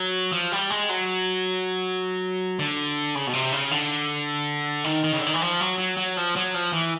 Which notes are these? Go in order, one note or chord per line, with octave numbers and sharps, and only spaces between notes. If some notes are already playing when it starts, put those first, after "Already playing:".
Already playing: F#3
F3
G3
G#3
F#3
D3
C#3
B2
C3
C#3
D3
D#3
D#3
C#3
D3
D#3
E3
F3
F#3
F#3
F#3
F3
F#3
F3
E3